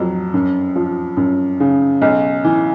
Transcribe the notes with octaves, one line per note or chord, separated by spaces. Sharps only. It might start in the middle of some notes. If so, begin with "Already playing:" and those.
Already playing: F2 F#3
F#2
F3
F#2
C#3
B1
E3